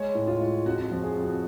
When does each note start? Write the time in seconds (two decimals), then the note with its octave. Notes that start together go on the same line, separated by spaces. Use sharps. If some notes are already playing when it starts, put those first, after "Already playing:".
Already playing: G#3 C#5
0.15 A2
0.27 F4
0.40 G#3
0.66 F2 F#4
0.85 F#4
0.91 F3
1.03 G#4
1.17 F2
1.23 F#4